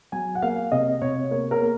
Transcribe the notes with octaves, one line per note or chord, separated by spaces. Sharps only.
F#3 G#5
F#5
A#3 F5
C3 D#5
C3 C#5
A#3 C#5
A#4
A#3